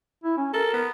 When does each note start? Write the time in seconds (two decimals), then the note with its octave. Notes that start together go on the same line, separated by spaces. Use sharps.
0.24 E4
0.37 C#4
0.53 A4 A#4
0.73 B3